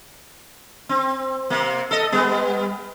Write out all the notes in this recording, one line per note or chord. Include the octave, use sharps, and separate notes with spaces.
C4
C3 A#3
A4 D#5
G3 B3